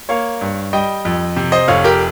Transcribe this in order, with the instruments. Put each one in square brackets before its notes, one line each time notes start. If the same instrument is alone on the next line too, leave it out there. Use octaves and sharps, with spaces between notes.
[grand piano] A#3 C#5 F5
G2
G3 D#5 G5
F2
C3
C5 D#5
F1 C#5 F5
G4 A#4